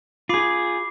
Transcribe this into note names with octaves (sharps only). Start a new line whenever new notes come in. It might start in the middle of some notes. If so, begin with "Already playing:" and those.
F4 G#4 B5 D6 C7